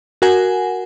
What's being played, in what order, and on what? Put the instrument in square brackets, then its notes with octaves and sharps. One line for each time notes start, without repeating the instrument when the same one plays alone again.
[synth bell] F#4 A#4 F#5 G#5